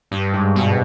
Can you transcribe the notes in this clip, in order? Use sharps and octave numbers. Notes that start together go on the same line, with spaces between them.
G2
G#2
B2